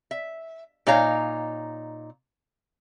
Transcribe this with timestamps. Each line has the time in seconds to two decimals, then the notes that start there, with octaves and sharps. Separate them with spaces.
0.11 E5
0.87 A#2 D#4 C#5 F5 A#5